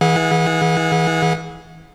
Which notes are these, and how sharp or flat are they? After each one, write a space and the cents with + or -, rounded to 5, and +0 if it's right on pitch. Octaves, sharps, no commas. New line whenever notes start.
E3 -25 G#4 +0 F#5 -35